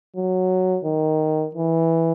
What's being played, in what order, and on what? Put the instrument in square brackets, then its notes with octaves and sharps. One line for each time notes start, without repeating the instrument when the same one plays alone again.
[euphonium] F#3
D#3
E3